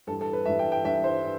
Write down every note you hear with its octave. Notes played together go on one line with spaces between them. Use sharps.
G2 E3 G3 A4
A4
B4
G2 E3 G3 E5
G5
G5
G2 E3 G3 E5
C5
E3